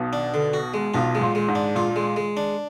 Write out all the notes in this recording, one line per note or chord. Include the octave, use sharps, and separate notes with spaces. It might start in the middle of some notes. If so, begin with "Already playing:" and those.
Already playing: B1 B2
D4
D3
F#4
G#3
B1 B2 F4
G#3
A#2
G#3
G#2
D4
A#2 F4
G#3
G#3
D4